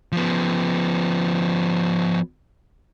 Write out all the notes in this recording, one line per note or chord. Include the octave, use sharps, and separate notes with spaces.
F3 B3